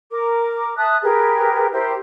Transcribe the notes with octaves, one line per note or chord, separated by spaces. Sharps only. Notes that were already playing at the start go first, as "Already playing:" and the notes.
A#4 D6
E5 A5 D#6 F#6
G4 G#4 A#4 B4
E4 G4 A#4 C5